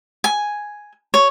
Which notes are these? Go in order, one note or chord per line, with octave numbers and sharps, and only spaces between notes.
G#5
C#5